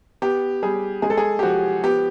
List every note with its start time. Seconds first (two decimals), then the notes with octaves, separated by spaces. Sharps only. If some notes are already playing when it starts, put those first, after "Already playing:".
0.22 B3 G4
0.62 G3 G#4
1.02 G#3 G#4
1.10 A4
1.17 G#4
1.39 G4
1.43 F3 F#4
1.84 B3 G4